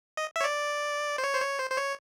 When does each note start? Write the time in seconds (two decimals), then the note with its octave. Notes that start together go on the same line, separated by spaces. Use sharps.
0.17 D#5
0.36 E5
0.41 C#5
0.44 D5
1.18 C5
1.24 C#5
1.35 C5
1.42 C#5
1.59 C5
1.70 C5
1.77 C#5